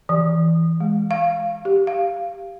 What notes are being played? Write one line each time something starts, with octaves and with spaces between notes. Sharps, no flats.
E3
G#3
F5
G4
F5